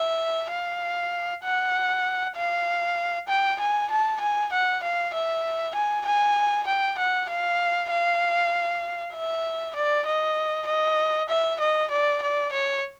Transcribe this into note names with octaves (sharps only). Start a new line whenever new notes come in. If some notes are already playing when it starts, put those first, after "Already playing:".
Already playing: E5
F5
F#5
F5
G5
G#5
A5
G#5
F#5
F5
E5
G#5
G#5
G5
F#5
F5
F5
E5
D5
D#5
D#5
E5
D#5
D5
D5
C#5